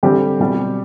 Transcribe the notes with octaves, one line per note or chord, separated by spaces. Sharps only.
D3 G3 C4 G4
B2 G3 C4